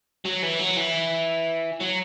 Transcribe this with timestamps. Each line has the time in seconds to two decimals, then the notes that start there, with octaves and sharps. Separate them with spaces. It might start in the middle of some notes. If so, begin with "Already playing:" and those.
0.25 F#3
0.42 E3
0.59 F#3
0.77 E3
1.80 F#3